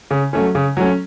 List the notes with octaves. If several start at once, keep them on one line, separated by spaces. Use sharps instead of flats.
C#3
F#3 A3 C#4
C#3
F#3 A3 C#4